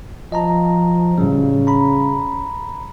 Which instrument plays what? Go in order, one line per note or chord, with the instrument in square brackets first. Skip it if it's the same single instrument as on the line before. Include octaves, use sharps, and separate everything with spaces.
[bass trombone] F3 [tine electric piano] D#5 A5 A#5
[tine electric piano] A2 F#3 G3 [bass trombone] C#3
[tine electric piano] A#5 B5